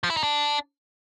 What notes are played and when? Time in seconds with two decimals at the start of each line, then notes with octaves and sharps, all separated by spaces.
0.03 F3
0.10 E4
0.17 D#4
0.23 D4